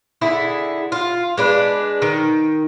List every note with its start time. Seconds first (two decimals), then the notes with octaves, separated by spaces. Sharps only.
0.21 D3 E4 G#4
0.92 F4
1.38 G#3 D4 B4
2.02 D#3